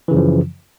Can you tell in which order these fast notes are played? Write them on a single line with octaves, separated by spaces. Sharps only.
E3 C#3 F#2 F3